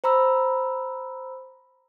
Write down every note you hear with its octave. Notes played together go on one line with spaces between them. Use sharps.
C5 A#5 B5 E6